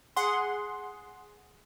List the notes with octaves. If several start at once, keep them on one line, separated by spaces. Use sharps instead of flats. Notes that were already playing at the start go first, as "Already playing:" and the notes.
G#4 F#5 C6